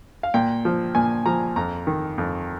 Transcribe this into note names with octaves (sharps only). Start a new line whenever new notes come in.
F5
A#2 G5
F3
A#2 G#5
F3 A#5
F2 A#5
D#3
F2